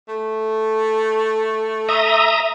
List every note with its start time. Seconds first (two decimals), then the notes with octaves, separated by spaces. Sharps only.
0.09 A3
1.89 E5 A#5 D#6